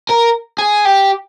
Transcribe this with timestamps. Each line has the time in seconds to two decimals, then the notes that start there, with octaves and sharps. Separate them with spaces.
0.09 A#4
0.58 G#4
0.85 G4